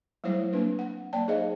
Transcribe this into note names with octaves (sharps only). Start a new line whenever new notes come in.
F#3 G3 A3 E4 C5 C#5
A#3 C4 D4 B4
F#5
F#3 A#3 C#5 D5 G5 A5
D#4 G#4 C5 D#5 F5